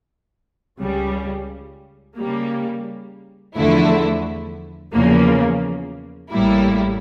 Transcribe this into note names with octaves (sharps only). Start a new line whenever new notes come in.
C#2 C#3 G3
C#3 G3 A#3
E2 D3 F3 A3 E4
E2 C#3 F3 A#3
A1 A2 G3 A#3 E4